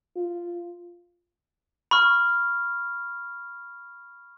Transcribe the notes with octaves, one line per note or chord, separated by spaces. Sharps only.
F4
B5 C#6 F6